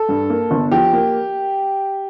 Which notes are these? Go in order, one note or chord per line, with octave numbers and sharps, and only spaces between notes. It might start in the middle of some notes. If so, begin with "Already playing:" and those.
Already playing: A4
G2
A#3
G1
F3 G4
A#3